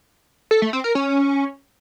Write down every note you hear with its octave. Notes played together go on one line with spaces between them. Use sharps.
A4
A3
C4
A#4
C#4